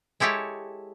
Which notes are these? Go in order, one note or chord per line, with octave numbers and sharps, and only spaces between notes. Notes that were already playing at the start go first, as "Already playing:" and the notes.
G#3 E4 G4 A4 C#5